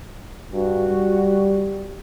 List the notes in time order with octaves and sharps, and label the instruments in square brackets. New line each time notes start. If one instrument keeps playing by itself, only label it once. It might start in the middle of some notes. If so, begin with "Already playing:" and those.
[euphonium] G2 [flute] F#4
[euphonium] G3